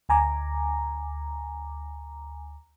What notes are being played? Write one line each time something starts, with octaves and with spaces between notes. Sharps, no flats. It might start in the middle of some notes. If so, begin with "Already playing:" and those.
D2 G#5 A#5 D6